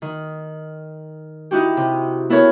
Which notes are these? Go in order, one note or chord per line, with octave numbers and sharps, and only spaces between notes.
D#3
D#4 E4 F#4 G4
C3
B3 E4 A4 A#4 C#5